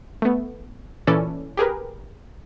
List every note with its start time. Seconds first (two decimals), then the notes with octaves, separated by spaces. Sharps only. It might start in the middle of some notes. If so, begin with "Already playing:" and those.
0.22 A3 B3
1.07 A#2 E3 C#4 A4 B4 D5
1.57 G4 G#4 A#4 B4